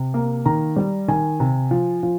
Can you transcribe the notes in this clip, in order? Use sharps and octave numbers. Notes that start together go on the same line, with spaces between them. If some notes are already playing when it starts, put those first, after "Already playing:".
Already playing: C3
A#3
D#3 A#5
G3
D#3 G#5
C3
F3
F3